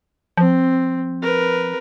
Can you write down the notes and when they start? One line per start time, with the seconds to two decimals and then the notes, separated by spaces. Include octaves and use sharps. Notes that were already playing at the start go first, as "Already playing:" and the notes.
0.37 F3 C4
1.22 A#4 B4